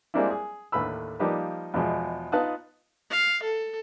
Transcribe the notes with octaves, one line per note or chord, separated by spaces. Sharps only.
G3 G#3 A#3 C4 D4 E4
G#4
D#2 A2 D3 B4 B5 E6
F3 G3 A#3 D#4 G4 B4
E2 B2 F3 G#3
B3 D#4 F4 A5 D#6 F#6
F5
A4